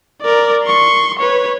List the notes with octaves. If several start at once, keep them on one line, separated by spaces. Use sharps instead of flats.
A#4 D5
C6 C#6
B4 C#5